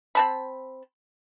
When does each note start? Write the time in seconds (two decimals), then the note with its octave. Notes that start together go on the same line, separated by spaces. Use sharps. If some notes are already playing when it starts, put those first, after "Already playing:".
0.15 C4 A5 B5